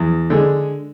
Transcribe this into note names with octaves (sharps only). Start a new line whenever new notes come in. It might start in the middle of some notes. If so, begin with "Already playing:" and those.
Already playing: E2
D3 G#3